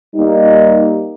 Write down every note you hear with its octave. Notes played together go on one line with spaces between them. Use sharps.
G3 A#3 D#4